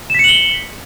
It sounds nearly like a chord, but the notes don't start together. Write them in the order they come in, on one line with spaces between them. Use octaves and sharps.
E7 B6 C#7 F#7 G7